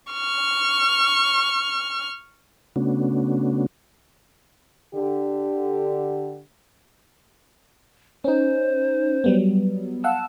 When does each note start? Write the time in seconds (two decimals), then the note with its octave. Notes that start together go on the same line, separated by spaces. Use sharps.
0.13 C#6 F6
2.76 C#3 A3 B3 C#4 D4 F#4
4.95 D3 G4
8.24 C#4 D#4 C5
9.24 F#3 G3 B3
10.04 F5 F#5 A5 E6